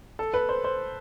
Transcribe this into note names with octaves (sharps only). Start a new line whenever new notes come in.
A4
B4
C5
C5